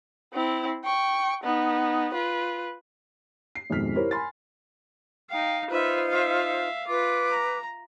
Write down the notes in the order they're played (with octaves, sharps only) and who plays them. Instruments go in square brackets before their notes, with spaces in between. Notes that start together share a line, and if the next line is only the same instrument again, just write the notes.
[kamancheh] C4 E4
G5 C#6
B3 D#4
F4 B4
[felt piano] C7
G#1 F2 B2 G#3 F6 B6
E4 G4 A#4 C5 C#5
G#5 B5 C6 A6
[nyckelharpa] D#4 F5 [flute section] G5
[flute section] D#4 F4 C5 [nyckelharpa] B4 E5
[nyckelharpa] E5 F5
[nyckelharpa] F4 [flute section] B4 D6
[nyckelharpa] A#5